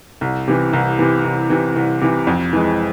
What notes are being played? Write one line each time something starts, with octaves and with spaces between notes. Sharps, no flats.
C2
C3 E3
C2
C3 E3
C2
C3 E3
C2
C3 E3
F2
E3 G#3